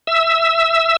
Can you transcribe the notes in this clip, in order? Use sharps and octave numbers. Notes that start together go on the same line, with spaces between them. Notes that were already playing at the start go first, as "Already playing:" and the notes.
E5 E6